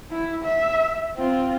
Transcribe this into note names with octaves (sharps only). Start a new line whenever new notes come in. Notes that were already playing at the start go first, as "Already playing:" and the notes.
E4
E5
C4 F4